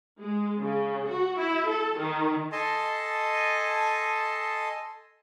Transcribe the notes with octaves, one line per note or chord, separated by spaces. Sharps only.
G#3
C#3
F#4
E4
A4
D#3
A4 D#5 G#5 A5 C6